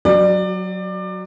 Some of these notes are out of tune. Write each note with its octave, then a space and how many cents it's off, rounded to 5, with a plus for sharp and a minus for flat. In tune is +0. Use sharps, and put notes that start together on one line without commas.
F#3 +0 F#4 +45 D5 +25